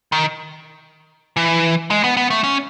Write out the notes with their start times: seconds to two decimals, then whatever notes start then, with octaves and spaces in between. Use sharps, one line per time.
0.12 D#3
1.37 E3
1.91 G#3
2.04 B3
2.17 B3
2.30 A3
2.44 C#4